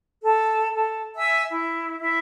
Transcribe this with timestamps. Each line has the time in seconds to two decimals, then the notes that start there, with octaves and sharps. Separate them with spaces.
0.21 A4
0.72 A4
1.15 E5 G#5 E6
1.51 E4
2.00 E4 E5